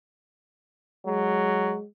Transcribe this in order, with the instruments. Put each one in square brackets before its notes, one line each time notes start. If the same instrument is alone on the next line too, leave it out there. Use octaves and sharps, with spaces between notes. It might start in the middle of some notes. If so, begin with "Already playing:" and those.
[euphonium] F#3 [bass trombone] G#3